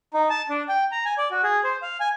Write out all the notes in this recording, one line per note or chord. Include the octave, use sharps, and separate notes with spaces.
D#4
A5
D4
G5
A#5
G#5
D5
F#4
G#4
C5
F5
G#5